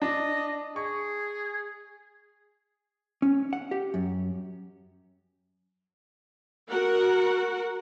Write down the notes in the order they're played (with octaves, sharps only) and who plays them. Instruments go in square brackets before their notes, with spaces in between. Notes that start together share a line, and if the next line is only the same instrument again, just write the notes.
[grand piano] D4 [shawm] D#5
[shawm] G#4 [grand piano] C#6
[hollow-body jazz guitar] C#4
F#5
G4
F#2
[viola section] F#4 A#4 F#5